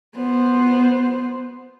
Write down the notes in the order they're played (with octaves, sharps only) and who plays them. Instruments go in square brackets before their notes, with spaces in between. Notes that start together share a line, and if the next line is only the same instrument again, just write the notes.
[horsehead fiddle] B3 C5